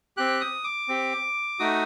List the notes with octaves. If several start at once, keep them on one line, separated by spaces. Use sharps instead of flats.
C4 G4 F#6
D#6
D6
C4 G4
A3 D#4 F#4 D#6